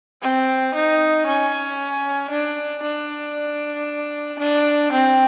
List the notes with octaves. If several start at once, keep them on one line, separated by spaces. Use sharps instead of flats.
C4
D#4
C#4
D4
D4
D4
C4